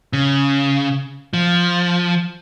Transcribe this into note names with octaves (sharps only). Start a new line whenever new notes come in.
C#3
F3